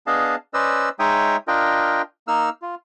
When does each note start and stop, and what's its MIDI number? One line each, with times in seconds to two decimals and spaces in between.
0.07 0.36 59
0.07 0.36 62
0.07 0.36 68
0.07 0.36 75
0.07 0.36 77
0.07 0.36 81
0.54 0.89 61
0.54 0.89 71
0.54 0.89 72
0.54 0.89 74
0.54 0.89 75
0.54 0.89 88
0.99 1.36 56
0.99 1.36 63
0.99 1.36 73
0.99 1.36 76
0.99 1.36 79
0.99 1.36 87
1.48 2.02 62
1.48 2.02 65
1.48 2.02 70
1.48 2.02 75
1.48 2.02 79
2.28 2.49 58
2.28 2.49 63
2.28 2.49 88
2.28 2.49 89
2.62 2.75 65